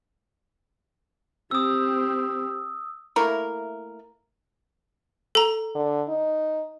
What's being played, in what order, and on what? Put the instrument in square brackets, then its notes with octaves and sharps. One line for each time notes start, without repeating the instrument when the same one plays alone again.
[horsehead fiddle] C4 G4 [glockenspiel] D#6 E6
[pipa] A3 A#3 E4 A#4
[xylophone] A4 A#5
[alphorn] D3
D#4